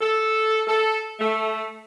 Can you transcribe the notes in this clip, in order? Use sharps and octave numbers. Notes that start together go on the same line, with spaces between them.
A4
A4
A3